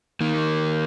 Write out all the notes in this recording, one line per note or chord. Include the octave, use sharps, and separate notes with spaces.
D#3 A#3